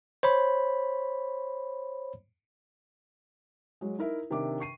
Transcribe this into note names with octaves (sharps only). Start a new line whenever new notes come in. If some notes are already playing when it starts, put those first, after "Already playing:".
C5 C#5 B5
F#3 G#3
D#4 E4 A#4 E5
C3 D#3 D4 A#4 E5 D6
C#6 C7 D#7